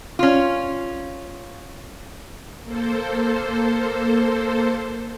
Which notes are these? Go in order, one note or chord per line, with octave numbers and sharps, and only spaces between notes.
C#4 F4
A#3 A4 C5